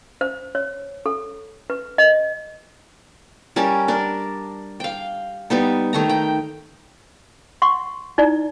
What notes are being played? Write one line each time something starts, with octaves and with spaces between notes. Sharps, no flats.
C5
C#5
A4
B4
D#5
G3 C#4 A#4 A5
D4 A#4
F5 G5
G3 B3 D#4
D#3 A3 A#5
G5
F#5 C6 C#6
D#4 E4 D5 A#5